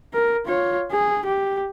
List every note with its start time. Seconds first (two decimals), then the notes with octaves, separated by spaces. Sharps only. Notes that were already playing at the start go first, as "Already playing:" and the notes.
0.13 A#4
0.46 F4 C#5
0.92 G#4
1.26 G4